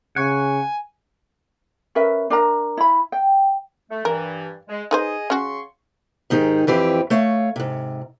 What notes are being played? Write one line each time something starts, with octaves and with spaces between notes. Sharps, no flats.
C#3 F#5 G#5 C#6
C#4 A#4 B4 E5
D4 A#4 A#5
E4 B5
G5
A3
G2 E3 A#4
G#3
D#4 G#4 B4 C5 D#5
C#3 C#4 F#4 C6 C#6
G#2 D#3 D#4 G4 G#4
F2 E3 C4 G4
A3 C#5 F5
G#2 C3